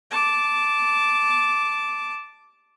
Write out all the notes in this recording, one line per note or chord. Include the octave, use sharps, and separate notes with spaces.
A5 D6